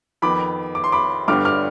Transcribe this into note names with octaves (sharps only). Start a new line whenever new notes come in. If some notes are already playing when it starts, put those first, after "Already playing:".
F2 D#3 B3 B5 D6
D6
C6
B5 D6
G1 G2 D3 G3 B3 D6 F6
D6 F6